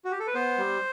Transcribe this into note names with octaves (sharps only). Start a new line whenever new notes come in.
F#4
G4
A4
B4
B3 C5
G3